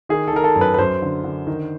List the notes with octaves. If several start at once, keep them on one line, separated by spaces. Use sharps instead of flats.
D#3 G#4
A4
D#3 A#4
A4
F#2
B4
B4
F#2 C5
D3
D3
D#3